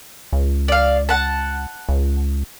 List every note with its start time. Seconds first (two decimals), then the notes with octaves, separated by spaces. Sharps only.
0.33 C#2
0.68 D5 F5
1.09 F#5 A5
1.89 C#2